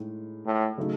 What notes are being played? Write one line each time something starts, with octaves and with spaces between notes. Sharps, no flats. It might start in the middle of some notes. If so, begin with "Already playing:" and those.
Already playing: A2 G#3 D#4
A2
C#3 F#3 A3 D#4